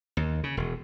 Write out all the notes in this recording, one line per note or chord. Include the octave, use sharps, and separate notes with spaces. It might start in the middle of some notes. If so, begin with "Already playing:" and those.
D#2
C#3
E1